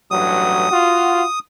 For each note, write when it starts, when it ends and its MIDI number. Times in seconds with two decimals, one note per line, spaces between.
0.11 0.67 33
0.11 0.67 43
0.11 0.67 54
0.11 1.39 87
0.71 1.22 65
0.71 1.22 66